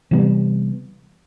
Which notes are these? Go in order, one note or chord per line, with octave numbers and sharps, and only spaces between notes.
C3 E3 G3 B3